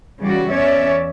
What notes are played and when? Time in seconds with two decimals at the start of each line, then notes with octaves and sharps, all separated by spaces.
0.20 C#3 E3 G3 F#4 D5
0.50 E2 C#4 C#5 D5 E5